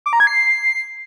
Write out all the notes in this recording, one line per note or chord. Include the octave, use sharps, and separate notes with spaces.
D6
A#5
G#6
C7